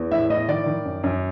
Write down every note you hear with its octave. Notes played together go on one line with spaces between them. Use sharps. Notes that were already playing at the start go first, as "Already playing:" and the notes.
Already playing: E2
A2 E5
A2 D#5
D#3 D5
D#3
F#2
F#2